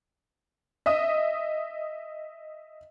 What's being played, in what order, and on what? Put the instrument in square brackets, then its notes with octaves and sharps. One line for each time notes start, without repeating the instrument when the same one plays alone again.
[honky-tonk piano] D#5 E5 D#6